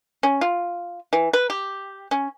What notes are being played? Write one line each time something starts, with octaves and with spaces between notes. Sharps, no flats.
C#4
F4
E3
B4
G4
C#4